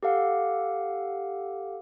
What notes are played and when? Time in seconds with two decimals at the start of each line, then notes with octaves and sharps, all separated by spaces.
0.03 G4 A4 F5 F#5